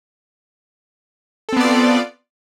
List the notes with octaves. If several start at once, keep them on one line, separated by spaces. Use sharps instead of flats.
B3 C4 F4 A4 D5